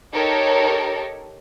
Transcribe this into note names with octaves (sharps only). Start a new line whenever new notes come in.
D#4 G4 A4 A#4 C#5